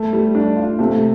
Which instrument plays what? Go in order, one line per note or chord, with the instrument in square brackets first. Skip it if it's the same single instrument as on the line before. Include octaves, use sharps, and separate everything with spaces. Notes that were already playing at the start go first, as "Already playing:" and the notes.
Already playing: [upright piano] A3
[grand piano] G3
D4
F4
[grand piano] C3 [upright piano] A3